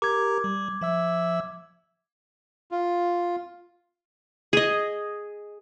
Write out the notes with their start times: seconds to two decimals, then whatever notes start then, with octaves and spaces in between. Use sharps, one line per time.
0.02 G4 A#4 A#5 D6 G#6
0.44 G3
0.81 F3 E5 E6
2.71 F4
4.53 G#4 D#5